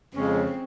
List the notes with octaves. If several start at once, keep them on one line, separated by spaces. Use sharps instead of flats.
F2 C#3 G#3 C4 C#4